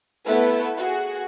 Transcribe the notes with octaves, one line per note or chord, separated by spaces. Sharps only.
A3 B3 E4 A4 B4
F#4 G#4